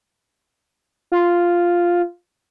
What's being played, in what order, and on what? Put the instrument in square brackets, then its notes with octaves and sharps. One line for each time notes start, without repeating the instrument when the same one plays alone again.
[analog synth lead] F4